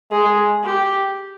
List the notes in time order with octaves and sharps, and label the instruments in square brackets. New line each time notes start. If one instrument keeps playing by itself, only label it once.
[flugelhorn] G#3 [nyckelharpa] G#4
[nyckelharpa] G4